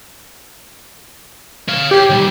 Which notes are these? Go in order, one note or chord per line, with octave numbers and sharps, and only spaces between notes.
C#5 F5
G4 C#5 G5
D#3 G3